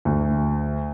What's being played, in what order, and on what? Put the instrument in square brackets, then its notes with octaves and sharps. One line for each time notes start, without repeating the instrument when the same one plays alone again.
[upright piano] D2